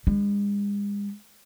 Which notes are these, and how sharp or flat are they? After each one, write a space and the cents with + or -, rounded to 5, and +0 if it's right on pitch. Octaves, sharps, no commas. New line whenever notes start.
G#3 -40 D4 -5